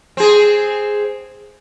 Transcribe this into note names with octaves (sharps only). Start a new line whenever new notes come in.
C4 G#4